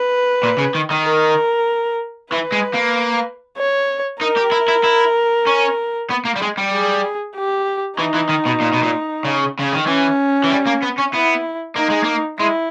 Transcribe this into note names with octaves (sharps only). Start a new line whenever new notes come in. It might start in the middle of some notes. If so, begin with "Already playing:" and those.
Already playing: B4
A#2
C#3
D#3
D#3
A#4
E3 B4
G#3
A#3
C#5
D#4 A#4
G4
E4
E4
E4
C#4
B3
A#3
G3
G#3
G3
G#4
G4
E3 D#4
E3
D#3
B2
A#2
B2
A#2
C#3
C#3
D#3
E3 C#4
E3
G3
A#3
B3
C#4
B3 E4
A#3 D#4
G#3
A#3
G#3 E4